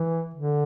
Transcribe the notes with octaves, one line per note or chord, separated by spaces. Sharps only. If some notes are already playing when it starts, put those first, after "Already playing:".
Already playing: E3
D3